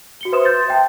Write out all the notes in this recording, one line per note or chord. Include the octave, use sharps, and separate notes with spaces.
F#4 C#7 G7
B4 C5 E5 C6 D#6 E7
C6 G6 A6
E5 G5 A5